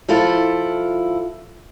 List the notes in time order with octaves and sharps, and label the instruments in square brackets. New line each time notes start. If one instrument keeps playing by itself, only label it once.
[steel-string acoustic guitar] F3 E4 F4 A4